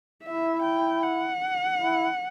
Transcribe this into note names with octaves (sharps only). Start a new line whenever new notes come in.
E4 E5
G5
F#5
E4